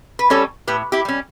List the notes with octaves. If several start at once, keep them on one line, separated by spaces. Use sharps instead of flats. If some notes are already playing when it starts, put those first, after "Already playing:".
B4
G3 C#4 A4 C#5
A2 G4 B4
E4 G4
G3 C#4